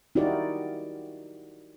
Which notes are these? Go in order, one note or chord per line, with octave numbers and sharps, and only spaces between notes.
D#4 E4 F#4 G4 A#4 D5